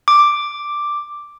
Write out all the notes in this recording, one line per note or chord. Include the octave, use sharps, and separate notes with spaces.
D6